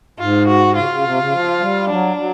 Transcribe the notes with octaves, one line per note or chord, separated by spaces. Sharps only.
G#2 F4
F#4
C#3 F4
C#3
C3
C#3
F3
G3
F#3 D4
F#3